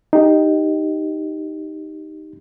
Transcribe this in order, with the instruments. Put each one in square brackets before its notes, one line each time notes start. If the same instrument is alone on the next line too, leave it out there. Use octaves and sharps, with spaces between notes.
[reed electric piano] D#4 G4